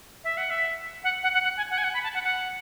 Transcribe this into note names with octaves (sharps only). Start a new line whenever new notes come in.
E5
F#5
E5
F#5
F#5
F#5
F#5
G#5
F#5
G#5
F#5
B5
A5
F#5
F#5